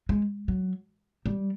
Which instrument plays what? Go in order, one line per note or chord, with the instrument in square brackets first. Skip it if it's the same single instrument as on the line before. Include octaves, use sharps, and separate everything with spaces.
[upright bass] G#3
F#3
G3